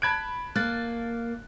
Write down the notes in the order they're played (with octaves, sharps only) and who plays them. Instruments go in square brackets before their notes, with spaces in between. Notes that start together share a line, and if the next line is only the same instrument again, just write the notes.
[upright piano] A5 G#6 D7 [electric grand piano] B5 F#6
[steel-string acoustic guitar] A#3 [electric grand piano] F#6 A6